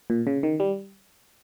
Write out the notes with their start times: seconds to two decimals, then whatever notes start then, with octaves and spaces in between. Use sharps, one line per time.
0.10 A#2
0.27 C#3
0.43 D#3
0.60 G3